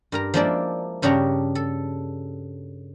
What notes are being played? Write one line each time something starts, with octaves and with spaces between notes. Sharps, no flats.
G2 A#4 A#5
F3 G#3 A#3 D4 E4 D5
G2 C#3 D4 G4 C#5 A#5
A4